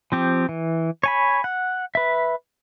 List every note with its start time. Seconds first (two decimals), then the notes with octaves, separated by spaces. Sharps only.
0.12 F3 C4 G4
0.49 E3
1.04 C#5 G#5 B5
1.44 F#5
1.95 B4 E5